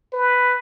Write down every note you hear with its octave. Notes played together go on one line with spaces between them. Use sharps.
B4